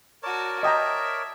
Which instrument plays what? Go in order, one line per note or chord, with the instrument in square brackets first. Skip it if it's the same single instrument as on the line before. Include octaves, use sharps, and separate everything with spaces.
[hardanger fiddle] F#4 A5 [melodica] A#4 C#5 D5
[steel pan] D#5 G5 A#5 [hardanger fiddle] E5 [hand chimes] A5 D#6